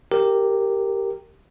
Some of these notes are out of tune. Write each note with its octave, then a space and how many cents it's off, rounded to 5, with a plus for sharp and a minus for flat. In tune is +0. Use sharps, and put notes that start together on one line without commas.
G4 +0 A#4 -10